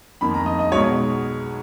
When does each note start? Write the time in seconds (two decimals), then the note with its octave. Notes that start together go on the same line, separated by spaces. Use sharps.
0.21 F2 D#3 A#3 B5
0.34 A#5
0.46 D#5
0.59 D#5
0.71 B1 B2 G#3 C#5